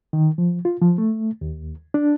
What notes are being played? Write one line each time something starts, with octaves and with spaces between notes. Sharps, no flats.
D#3
F3
F4
F3
A3
D#2
D4